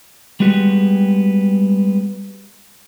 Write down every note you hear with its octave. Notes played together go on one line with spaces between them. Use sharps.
G3 G#3 B3 F#4 G4